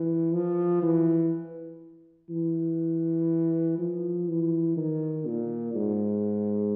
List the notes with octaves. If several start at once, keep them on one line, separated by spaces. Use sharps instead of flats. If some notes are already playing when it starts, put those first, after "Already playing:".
Already playing: E3
F3
E3
E3
F3
E3
D#3
A#2
G#2